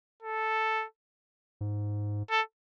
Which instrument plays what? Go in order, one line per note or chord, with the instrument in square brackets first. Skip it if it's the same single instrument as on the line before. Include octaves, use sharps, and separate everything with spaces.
[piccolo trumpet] A4
[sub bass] G#2
[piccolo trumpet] A4